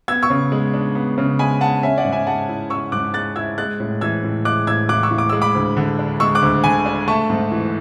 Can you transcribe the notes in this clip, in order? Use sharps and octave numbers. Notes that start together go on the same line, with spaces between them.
B3 E6 G#6
C#6 E6
C#3
G#3
D4
B3
C#3
G#3 G#5 B5
D4 F#5 A5
C#4 E5 G#5
D5 F#5
G#2
E5 G#5
G#3 F#5 A5
E4
C#4 C#6 E6
G#2 D6 F#6
G#3 F#6 A6
E4 E6 G#6
G#3 F#6 A6
A2
E3 E6 G#6
A2
G#3 D6 F#6
A2 E6 G#6
E3 D6 F#6
C#6 E6
A2
D6
G#3 E6
B5 D6
D2
D3
D4
G#3 C#6 E6
D6 F#6
D2
D3 G#5 B5
D4
A3 A5 C#6
G#2
E3